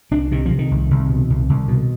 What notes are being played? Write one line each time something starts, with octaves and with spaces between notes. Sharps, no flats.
C2 D4
C3 D#3
C3 F3
D#3
C2
C2
B2
C2
C2
B2